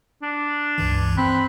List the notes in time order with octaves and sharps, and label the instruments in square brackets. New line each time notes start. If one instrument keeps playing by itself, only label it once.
[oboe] D4
[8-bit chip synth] C#2 G2 E3
[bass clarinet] C4 [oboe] B5 [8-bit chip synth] F#6